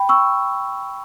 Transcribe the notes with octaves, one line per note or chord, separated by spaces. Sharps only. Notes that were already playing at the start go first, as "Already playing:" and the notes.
Already playing: G5 B5
C#6 E6